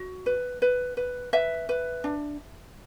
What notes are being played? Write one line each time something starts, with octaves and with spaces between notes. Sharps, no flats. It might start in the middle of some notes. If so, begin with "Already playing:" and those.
Already playing: F#4
B4
B4
B4
B4 E5
B4
D4